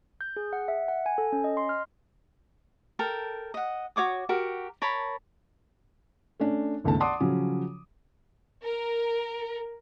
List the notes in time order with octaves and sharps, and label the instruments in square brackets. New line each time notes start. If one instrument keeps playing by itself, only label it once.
[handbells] G6
G#4
F#5
E5
F#5
G#5
A4
C#4
D#5
C6
F6
[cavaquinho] A4 A#4 G5
D#5 F#5
F#4 C#5 D6 D#6
F#4 G4 A#4
A#4 C#5 A5 B5
[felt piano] A3 C#4 D4
G1 C#2 D#3 A3 A5
D5 F#5 A5 C6 D6 D#6
C#3 F3 F#3 C#4
[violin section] A#4